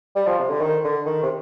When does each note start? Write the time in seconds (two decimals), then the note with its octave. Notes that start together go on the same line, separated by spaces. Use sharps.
0.16 G3
0.27 F3
0.39 C3
0.50 D3
0.61 D#3
0.84 D3
1.06 D#3
1.23 C3